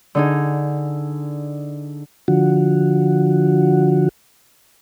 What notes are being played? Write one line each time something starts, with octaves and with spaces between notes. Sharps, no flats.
D3 D#4 G#4
D3 F3 F#4